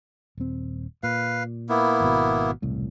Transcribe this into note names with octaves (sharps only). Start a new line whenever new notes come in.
D#1 C4
A#2 B4 F5
A#3 B3 E4
G#1 B2
E1 C2 A2